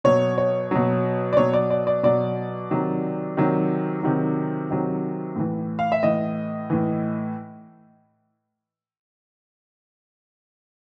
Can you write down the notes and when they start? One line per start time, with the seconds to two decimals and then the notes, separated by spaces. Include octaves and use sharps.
0.04 B2 F#3 C#5
0.38 C#5
0.71 B2 F#3
1.33 D5
1.37 B2 F#3 C#5
1.53 D5
1.70 D5
1.87 D5
2.03 B2 F#3 D5
2.71 C3 D#3 F#3
3.37 C3 D#3 F#3
4.03 C3 D#3 F#3
4.70 C3 D#3 F#3
5.36 A2 E3
5.79 F5
5.92 E5
6.03 A2 E3 D#5
6.70 A2 E3